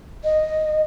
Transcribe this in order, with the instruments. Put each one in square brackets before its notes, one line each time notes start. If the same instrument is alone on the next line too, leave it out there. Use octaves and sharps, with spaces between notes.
[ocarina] D#5